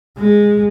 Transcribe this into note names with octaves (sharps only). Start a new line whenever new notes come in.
G#3